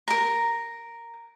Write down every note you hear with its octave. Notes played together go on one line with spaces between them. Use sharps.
A#4 A#5